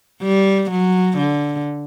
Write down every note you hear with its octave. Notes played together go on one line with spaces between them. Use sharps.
G3
F#3
D3